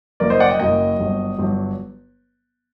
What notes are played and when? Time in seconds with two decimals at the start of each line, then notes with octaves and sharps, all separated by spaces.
0.20 F#1 F#2 F#3 A#3 A#4 D5
0.30 C5 D#5
0.40 D5 F#5
0.49 D#5 G5
0.60 F#1 F#2 F#3 A#3 D#5 G5
0.99 G1 G2 F#3
1.38 G1 G2 F#3